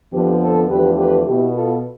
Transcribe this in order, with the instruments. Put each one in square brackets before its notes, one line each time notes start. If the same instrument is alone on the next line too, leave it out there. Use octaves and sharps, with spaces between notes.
[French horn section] F2 D3 F3 B3 G4 B4
A4 C5
E2 D3 F3 A3 G4 B4
G4 B4
B2 B3 E4 G4
F4 A4